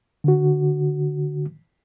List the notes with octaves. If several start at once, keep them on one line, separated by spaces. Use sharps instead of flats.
D3 F#4